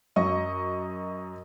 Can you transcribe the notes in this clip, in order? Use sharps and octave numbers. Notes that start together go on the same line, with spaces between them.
F#2 D#5 C#6